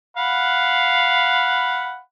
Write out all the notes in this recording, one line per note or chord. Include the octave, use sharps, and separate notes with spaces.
F5 F#5 B5